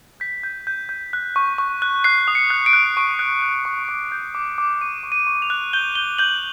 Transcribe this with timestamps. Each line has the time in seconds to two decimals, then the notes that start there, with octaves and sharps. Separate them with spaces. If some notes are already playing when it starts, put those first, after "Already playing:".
0.20 G6 B6
0.43 G6
0.67 G6
0.89 G6
1.13 F#6
1.36 C#6
1.58 C#6
1.82 F#6
2.04 F#6 C7
2.28 D#6
2.35 C#7
2.50 F#6
2.66 D7
2.73 F#6
2.97 C#6 D7
3.19 F#6
3.42 F#6
3.65 C#6
3.89 D6
4.12 G6
4.35 D6
4.58 D6
4.81 C#6 D#7
5.03 C#6
5.12 D#7
5.27 C#6
5.42 F7
5.50 F#6
5.73 G6 G7
5.95 G6 G7
6.18 G6 F#7